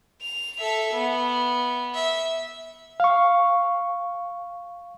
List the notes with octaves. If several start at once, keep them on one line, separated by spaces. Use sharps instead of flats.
F7
A4 E5
B3
E5
F5 C#6